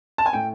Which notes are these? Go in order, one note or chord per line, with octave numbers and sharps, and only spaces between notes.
A5
G#5
A2 G5